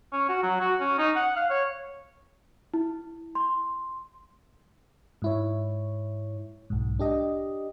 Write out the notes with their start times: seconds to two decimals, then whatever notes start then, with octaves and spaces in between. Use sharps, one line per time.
0.13 C#4
0.29 F#4
0.43 F#3
0.60 F#4
0.80 C#4
0.98 D#4
1.16 F#5
1.36 F5
1.50 C#5
2.74 E4
3.35 C6
5.22 G#2 E4 C#5
6.70 B1 G#2
6.99 D4 G4 D#5